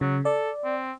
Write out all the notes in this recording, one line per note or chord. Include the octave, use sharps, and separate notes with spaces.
C#3 F#3
A4 D5
C4